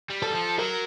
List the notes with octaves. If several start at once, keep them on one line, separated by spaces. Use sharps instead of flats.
G3
A4
E3
F3
F#3 A#4